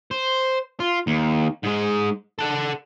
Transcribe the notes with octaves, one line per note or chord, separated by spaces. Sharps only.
C5
F4
D#2
G#2 G#3
A4 F#5